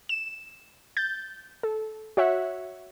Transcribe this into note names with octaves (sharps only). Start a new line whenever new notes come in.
E7
G6 A6
A4
F#4 C#5 E5 F#5